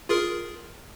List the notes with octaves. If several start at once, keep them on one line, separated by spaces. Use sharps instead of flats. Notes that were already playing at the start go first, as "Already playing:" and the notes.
F4 G#4 A#4